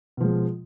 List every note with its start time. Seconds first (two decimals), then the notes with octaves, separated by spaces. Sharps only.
0.17 B2
0.21 F3
0.24 G#3